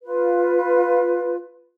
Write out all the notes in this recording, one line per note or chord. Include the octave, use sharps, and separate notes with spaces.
F4 B4